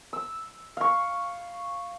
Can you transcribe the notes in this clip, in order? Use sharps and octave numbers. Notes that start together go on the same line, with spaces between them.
E6
F5 C#6